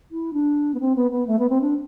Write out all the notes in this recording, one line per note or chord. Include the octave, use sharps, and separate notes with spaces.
E4
D4
B3
C4
B3
B3
A3
B3
C4
D4